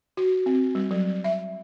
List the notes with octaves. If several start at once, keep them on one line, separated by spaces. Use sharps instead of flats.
F#4
C4
G3
F#3
E5